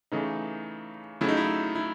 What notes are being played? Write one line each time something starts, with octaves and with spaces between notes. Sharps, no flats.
C#3 E3 A3 D#4
C#3 F#3 A3 E4
D#4
E4
E4